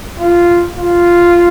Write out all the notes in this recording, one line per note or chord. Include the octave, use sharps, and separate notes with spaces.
F4
F4